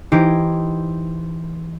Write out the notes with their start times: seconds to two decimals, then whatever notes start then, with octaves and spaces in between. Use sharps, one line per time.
0.12 E3 D#4 E4 G4 C5